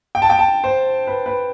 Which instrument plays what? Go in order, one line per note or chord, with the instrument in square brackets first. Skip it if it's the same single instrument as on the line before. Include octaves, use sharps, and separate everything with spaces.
[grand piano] G5
A5
G5
A5
C5
B4
B4